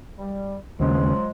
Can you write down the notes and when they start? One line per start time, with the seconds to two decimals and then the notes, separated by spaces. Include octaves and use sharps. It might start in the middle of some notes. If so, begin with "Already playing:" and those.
0.19 G3
0.80 D#2 C#3 F3 F#3 G#3